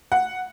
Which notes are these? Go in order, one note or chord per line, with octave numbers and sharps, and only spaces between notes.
F#5